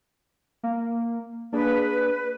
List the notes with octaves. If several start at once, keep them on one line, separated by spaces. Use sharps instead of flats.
A#3
A#3 D4 G#4 B4